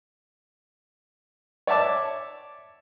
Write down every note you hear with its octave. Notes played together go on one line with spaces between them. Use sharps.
C#5 D5 E5 A5 D6